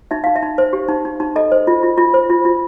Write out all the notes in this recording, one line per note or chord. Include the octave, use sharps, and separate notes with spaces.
D#4 E5
D#4 F5
E5
D#4
C5
G4
D#4
D#4
D#4
A4 D#5
C5
F4
F4
F4
C5
F4
F4